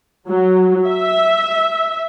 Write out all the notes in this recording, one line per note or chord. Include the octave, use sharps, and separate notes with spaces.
F#3
E5